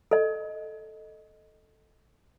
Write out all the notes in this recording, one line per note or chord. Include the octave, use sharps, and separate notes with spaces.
A4 D#5